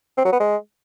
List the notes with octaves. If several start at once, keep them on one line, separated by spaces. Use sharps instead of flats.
C4
F#3
B3
G#3